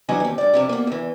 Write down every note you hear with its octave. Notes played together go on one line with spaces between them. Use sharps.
G2 E3 F#3 D4 D#5 G#5
D#2 C4
G2 D5
F2 C3 E4
A#3 B3
E2 E3